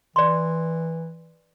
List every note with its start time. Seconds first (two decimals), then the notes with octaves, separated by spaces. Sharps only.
0.16 E3 D5 C6